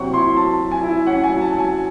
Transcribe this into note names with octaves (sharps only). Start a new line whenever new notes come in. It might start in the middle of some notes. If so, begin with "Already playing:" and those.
Already playing: C3 F#3 C4 E4 F#5 C#6
E4 C6
C6
F#3 A5
F#3
G#5
E4
C#4 F#5
G#5
F#3
A5
F#3
G#5